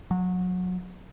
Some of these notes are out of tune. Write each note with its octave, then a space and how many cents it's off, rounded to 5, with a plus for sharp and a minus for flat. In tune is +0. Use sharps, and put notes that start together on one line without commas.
F#3 -25